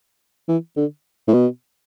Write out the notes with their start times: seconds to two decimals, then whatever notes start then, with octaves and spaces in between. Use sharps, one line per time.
0.48 E3
0.77 D3
1.28 A2
1.33 B2